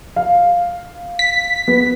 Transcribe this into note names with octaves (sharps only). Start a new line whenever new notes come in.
F5
B6
B3